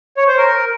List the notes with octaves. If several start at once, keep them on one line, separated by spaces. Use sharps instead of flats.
C#5
C5
A#4